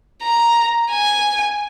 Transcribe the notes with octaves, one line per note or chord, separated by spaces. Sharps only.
A#5
G#5